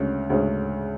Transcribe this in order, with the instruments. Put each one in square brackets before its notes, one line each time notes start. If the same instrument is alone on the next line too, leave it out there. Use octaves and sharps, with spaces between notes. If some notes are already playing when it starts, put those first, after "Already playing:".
Already playing: [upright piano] D2 C#3 G#3 C#4
D2 C#3 G#3 C#4